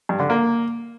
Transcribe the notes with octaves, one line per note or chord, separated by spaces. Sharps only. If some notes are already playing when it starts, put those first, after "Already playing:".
G2
D3
A#3